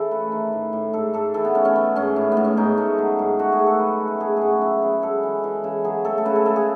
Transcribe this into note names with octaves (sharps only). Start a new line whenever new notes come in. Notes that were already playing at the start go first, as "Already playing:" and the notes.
Already playing: C#3 E3 A4
A3 B4
D#3
A2
A2
G#2 A4
G#2 A4
E3 A4
B3
A3 C#4
C#4
A3 B3
G#2 C#4
A2
B3
A2
C#4
G#2 D#4
A3
F#3
G#2
A3 F#4
G#4
A3
A4
F#2 B4
A3
B4
A3 G#4
A2 F#4 G#4
F#2 E4
F#2 G#4
G#3 A4
E3
E3
C#3
F#3 G#4
A3 A4
A4
C#3 B4
A4
G#3 A4
G#4